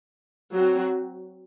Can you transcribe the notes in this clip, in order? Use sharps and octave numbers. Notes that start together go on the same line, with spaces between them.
F#3 C4 F#4